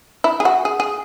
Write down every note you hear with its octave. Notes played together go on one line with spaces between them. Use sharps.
E4
G#4
F#4
G#4
G#4